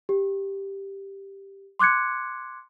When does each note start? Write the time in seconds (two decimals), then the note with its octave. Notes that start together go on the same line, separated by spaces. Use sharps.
0.09 G4
1.79 C6 D6 F#6 G#6 C#7